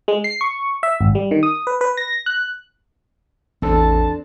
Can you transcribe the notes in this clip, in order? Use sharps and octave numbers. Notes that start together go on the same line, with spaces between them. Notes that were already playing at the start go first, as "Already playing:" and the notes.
G#3
C7
C#6
E5
G#1
G3
D#3
D#6
B4
B4
A#6
F#6
A1 E2 C4 D4 A4 A5